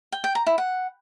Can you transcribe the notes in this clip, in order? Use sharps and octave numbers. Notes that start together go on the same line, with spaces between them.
G5
G5
A#5
E4
F#5